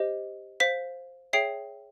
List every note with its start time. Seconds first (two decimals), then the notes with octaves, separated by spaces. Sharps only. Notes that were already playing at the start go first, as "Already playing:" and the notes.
Already playing: G4 C5 D#5
0.60 C5 F5 B6
1.33 G#4 C#5 E5 G5 C7